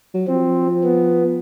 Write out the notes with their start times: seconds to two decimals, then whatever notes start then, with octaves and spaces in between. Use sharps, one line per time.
0.14 F#3
0.27 F3 C4
0.84 B3